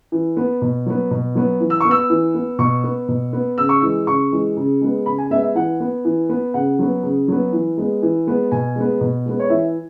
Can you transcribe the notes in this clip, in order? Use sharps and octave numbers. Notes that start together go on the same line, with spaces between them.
E3
B3
B2
F#3 B3
B2
F#3 B3
E3
E6
B3 C#6
E6
E3
B3
B2 C#6
B3
B2
B3
C#3 E6
C#6
E3 G#3 E6
C#3 C#6
E3 G#3
C#3
G#3 B3
C#3 B5
G#5
G#3 B3 E5
E5
E3 F#5
B3
E3
B3
C#3 F#5
F#3 B3
C#3
F#3 B3
E3
G#3 B3
E3
G#3 B3
B2 G#5
G#3 B3
B2
G#3 B3
C#5
E3 E5